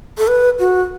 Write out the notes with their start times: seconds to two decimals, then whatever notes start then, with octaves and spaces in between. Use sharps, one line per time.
0.18 A4
0.28 B4
0.59 F#4